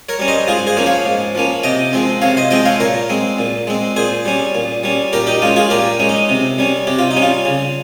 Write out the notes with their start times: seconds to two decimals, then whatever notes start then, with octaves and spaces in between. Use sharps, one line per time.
0.09 A#4 C#5
0.19 G3 C#4
0.28 C5 D#5
0.48 G#2 F4 G#4
0.67 G#4 C5
0.77 F3 A#3 C#4
0.86 C#5 F5
1.05 G#2
1.35 F3 A#3 C#4
1.64 C3 D#5 G5
1.93 F3 G#3 C4
2.22 C3 C#5 F5
2.37 C5 D#5
2.51 F3 G#3 C4 D#5 G5
2.66 C#5 F5
2.80 A#2 A#4 C#5
3.09 G#3 C4
3.39 A#2
3.67 G#3 C4
3.96 A#2 G#4 C5
4.25 G3 C#4
4.55 A#2
4.84 G3 C#4
5.13 A#2 G4 A#4
5.27 D#4 G4
5.42 G#3 C#4 F4
5.56 F4 G#4
5.70 A#2 G4 A#4
6.00 G#3 C#4
6.09 D#4
6.29 C3
6.58 G3 C#4
6.87 C3 G4
6.99 F4
7.11 D#4
7.16 G3 C#4
7.22 F4
7.45 C#3